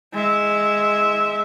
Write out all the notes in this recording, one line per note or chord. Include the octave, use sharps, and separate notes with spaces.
G#3 E5